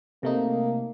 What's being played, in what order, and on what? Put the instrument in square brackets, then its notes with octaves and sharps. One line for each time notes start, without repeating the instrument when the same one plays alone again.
[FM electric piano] C3 A3 D#4 [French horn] A#3